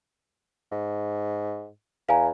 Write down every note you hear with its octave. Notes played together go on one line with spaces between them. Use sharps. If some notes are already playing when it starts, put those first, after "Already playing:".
G#2
E2 F5 G#5 A#5